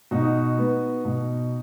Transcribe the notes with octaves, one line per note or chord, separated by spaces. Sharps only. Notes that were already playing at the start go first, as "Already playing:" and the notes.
B2 D#4 F#4
B3
B2